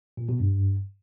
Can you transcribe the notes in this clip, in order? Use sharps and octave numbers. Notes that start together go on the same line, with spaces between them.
A#2
B2
G2